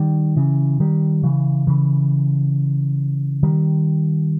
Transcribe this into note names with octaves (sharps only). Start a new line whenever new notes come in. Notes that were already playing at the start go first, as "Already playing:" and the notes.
Already playing: D#3 G3
C#3 E3
D#3 G3
C#3 E3
C#3 E3
D#3 G3